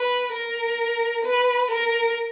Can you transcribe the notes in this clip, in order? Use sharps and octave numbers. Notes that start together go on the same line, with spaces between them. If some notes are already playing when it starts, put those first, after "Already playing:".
Already playing: B4
A#4
B4
A#4